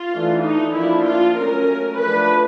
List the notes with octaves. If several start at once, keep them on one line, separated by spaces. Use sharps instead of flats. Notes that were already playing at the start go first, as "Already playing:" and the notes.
Already playing: F4
E3 A3 D4
D#4
F3 A#3 D4 E4
F4
F#3 A3 C#4 A#4
F3 A3 D4 B4